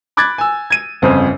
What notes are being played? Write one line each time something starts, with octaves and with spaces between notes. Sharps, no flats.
B5 D6 F#6 G#6 A6
G#5 E6
G#6 D#7
G1 F2 C#3 C5 D#6